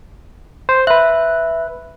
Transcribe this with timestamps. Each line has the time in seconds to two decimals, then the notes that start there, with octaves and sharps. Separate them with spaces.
0.69 C5
0.87 B4 E5 F#6